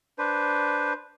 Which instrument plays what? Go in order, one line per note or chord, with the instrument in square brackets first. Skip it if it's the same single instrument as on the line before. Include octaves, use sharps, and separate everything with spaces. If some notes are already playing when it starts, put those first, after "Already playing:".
[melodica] D4 B4 C5